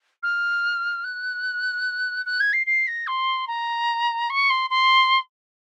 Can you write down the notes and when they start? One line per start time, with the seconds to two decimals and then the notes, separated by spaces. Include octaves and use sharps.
0.22 F6
1.04 F#6
2.25 F#6
2.40 G#6
2.53 C7
2.66 C7
2.87 A#6
3.07 C6
3.47 A#5
4.29 C#6
4.49 C6
4.70 C6